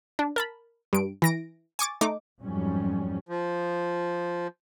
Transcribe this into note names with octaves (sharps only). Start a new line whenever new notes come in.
D4
A#4 A5 B5
G2 D7
E3 A#6 D7
G#5 C#6 D6 A6
A3 D#4 D6
F2 G#2 F#3 G3 C#4
F3